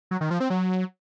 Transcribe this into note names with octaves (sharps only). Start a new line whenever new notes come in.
F#3
D#3
F3
C4
F#3